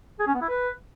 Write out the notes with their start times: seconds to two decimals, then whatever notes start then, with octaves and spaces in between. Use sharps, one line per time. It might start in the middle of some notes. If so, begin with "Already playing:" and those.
0.19 G#4
0.27 C#4
0.34 B3
0.42 E4
0.49 B4